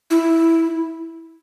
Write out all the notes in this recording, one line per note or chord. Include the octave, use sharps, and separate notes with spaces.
E4